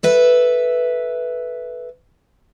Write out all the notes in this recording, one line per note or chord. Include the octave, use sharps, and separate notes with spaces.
A4 B4 E5